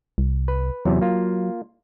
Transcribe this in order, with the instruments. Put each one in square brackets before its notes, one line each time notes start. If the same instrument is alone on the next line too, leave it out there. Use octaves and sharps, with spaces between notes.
[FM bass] C2
[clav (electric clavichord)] B4
[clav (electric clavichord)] E2 C3 [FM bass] F#3
[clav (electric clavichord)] A#3 F4